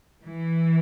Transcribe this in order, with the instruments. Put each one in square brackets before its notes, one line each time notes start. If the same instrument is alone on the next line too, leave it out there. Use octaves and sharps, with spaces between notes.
[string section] E3